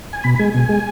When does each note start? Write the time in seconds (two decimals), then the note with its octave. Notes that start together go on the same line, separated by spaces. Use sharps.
0.13 G#5
0.24 B2 B5
0.35 B5
0.39 G#3 G#5
0.54 B2
0.69 G#3